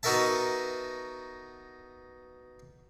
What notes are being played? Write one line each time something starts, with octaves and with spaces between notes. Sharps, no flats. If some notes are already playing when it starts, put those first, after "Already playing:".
B3 D#4 F#4 A#4 E5 A5